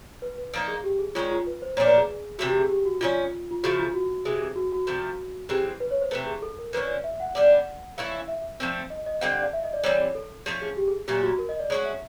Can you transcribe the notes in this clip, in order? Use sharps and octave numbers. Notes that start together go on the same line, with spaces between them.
B4
B4
F3 A#3 D#4
G#4
G4
G#4
D#3 G#3 C#4 F4
F4
B4
C5
A#2 F3 A3 D4 C#5
B4
G#4
C3 E3 A3 F#4
G4
G#4
G4
F#4
F3 A3 C#4 F4
F4
C#3 F3 A3 F#4
F4
F#4
C3 E3 G#3 F#4
G#4
F#4
F#4
C3 F3 A3
E3 G#3 C4 G4
B4
C#5
C5
C3 E3 A3 B4
G#4
A4
A#4
D3 F3 A#3 C#4 B4
E5
F#5
G3 B3 D4
E3 A3 C#4 E4 F5
E5
F3 A3 C4
D#5
D#5
D3 G3 C4 F5
F#5
F5
E5
D#5
D5
E3 G3 C4 C#5
A4
F3 A3 C#4
G#4
G4
G#4
A#2 F#3 A3 C#4 G4
F#4
A#4
D#5
D5
G#3 C#4 F#4 C#5
E5